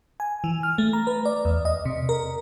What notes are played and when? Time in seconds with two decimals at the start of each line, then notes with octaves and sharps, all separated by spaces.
0.20 G#5
0.44 E3
0.63 F6
0.78 A3
0.93 A#5
1.07 B4
1.25 D5
1.45 E2
1.65 D#5
1.85 C3
2.09 A#4